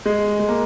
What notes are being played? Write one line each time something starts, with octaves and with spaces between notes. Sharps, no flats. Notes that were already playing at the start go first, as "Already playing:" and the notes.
G#3
G#3
A#3